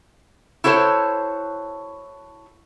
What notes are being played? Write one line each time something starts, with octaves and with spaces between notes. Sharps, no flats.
E4 F#4 A4 C5 C#5